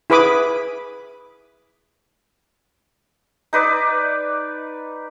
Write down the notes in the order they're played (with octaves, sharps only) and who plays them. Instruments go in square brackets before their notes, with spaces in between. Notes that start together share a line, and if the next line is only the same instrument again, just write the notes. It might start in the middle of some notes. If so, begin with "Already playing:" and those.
[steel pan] E4 G#4 B4 B5 D6 D#6
[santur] D#4 B4 D5